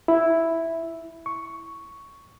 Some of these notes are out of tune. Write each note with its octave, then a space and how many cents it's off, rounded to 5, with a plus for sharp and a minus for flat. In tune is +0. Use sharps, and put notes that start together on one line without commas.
E4 +0
C#6 +5